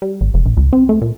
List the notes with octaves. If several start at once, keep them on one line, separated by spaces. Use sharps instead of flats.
G3
G#1
F1
A#1
C#2
C4
A3
A#2